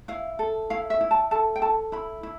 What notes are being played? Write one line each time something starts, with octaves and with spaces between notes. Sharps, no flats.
E4 F5
A4
E4 F5
E5
E4
A5
A4 A5
G5
A4 A5
E4 B5
E4